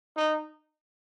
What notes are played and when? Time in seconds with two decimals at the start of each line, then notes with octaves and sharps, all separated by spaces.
0.17 D#4